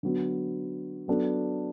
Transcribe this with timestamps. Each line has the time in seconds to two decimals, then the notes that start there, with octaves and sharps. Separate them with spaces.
0.03 D3 F#3 B3
1.08 F#3 B3 D4 A4